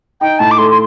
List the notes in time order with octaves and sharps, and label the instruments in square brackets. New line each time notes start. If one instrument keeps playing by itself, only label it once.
[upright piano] D#4 [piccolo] G5
[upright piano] A2 [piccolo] A5
[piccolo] D6
[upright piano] A3 [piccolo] C6
[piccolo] C6